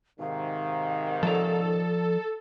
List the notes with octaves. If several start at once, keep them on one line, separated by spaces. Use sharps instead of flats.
G#2 C3 D#3 F5
F3 A4 D5 A#5